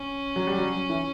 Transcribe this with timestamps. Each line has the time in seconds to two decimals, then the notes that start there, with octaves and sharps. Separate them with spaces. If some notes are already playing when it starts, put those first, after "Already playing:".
Already playing: C#4
0.36 F#3
0.47 G3
0.58 F#3
0.89 E3